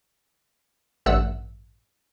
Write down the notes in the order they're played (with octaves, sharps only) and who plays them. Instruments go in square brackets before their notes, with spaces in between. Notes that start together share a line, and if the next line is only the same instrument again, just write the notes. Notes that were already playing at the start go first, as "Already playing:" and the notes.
[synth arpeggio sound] A1 G2 A3 F#5 E6